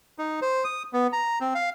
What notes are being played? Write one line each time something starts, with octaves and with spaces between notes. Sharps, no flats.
D#4
C5
D#6
B3
A#5
C4
F5